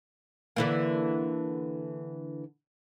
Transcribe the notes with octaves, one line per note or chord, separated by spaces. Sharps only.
D3 E3 A#3